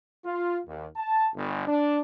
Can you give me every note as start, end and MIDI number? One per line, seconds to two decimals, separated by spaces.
0.24 0.59 65
0.65 0.87 39
0.96 1.29 81
1.35 1.64 31
1.67 2.00 62